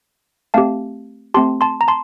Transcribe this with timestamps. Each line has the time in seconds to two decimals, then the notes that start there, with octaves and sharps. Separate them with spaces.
0.54 A3 C4 G4 F5 A5
1.34 A3 C4 G4 A5 C6
1.61 A5 C6
1.81 A#5
1.88 A5 C6